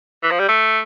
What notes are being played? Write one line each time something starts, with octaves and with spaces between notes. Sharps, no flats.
E3
F3
G3
A3